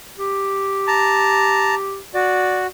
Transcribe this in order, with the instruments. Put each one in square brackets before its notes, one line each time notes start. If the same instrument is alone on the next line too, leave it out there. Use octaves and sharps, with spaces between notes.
[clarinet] G4
[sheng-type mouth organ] A5 A#5
[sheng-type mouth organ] F#4 [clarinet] D5